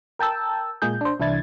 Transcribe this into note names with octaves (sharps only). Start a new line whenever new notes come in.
A#4 G5 A5 E6
A#2 G#3 A#3 G#4 G6
D4 C5
C2 E3 D4 E4 G#6 A6